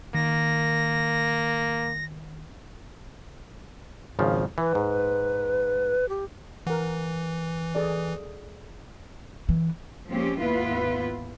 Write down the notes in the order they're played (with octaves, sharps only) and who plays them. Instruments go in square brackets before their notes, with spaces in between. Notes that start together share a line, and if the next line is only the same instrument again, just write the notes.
[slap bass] D#3 [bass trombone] A#3 [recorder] A#6
[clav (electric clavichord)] G#1 C#3 F3
[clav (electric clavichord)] E3 [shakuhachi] B4
[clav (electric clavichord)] G#2
[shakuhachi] G4
[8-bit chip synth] E3 [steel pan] A#4 F#5
[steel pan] G#4 A4 D5
[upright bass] E3
[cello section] F3 G#3 A#3 C4 C#4 G4
D#2 G#2 B3 E4 F4 B4